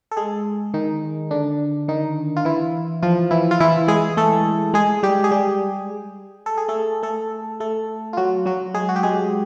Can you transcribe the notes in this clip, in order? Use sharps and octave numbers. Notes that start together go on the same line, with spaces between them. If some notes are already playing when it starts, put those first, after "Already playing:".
A4
G#3 G#4
D#3 D#4
D3 D4
D#3 D#4
F4
E3 E4
F3 F4
E3 E4
F4
E3 E4
G#3 G#4
A3 A4
G#3 G#4
G3 G4
G#4
G3 G4
A4
G#4
A3 A4
A3 A4
A3 A4
F4
F#3 F#4
F#3 F#4
G#3 G#4
F#4
G4
G#3 G#4